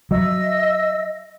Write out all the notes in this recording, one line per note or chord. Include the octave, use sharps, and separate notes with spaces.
F#3 D#5 E5 E6